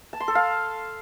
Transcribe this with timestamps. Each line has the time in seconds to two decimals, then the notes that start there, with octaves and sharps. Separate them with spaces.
0.13 A5
0.20 C6
0.28 A4
0.35 F5